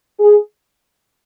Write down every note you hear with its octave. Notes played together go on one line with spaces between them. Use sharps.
G#4